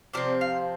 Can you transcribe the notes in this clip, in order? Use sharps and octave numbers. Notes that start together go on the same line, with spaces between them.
C3 F3 C4 D5
F5